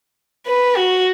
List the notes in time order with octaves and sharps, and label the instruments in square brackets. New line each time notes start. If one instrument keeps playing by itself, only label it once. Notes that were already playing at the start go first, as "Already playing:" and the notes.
[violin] B4
F#4